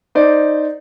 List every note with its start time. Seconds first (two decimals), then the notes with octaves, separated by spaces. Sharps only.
0.15 D#4 C5 D5